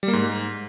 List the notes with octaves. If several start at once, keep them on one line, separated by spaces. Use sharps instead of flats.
G3
A#3
G#2